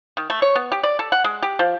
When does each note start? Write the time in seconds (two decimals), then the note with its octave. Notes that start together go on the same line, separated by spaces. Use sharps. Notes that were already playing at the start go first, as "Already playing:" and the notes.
0.17 D#3
0.30 A3
0.42 C#5
0.56 B3
0.72 G4
0.83 D5
0.99 A4
1.12 F#5
1.24 G#3
1.42 G4
1.59 F3